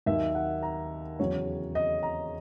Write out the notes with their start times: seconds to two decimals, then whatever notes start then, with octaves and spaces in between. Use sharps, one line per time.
0.06 D#2 D#3 F#3 A#3 D#4 E5
0.35 F#5
0.63 A#5
1.20 E2 C#3 F#3 C#5
1.75 D#5
2.03 A#5